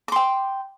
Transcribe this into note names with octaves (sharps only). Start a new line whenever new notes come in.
G5 C6 D6